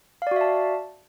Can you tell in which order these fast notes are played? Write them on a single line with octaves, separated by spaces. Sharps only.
F5 D5 F#4 E5 A5